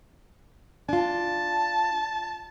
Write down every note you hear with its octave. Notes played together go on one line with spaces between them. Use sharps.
D4 F4 A5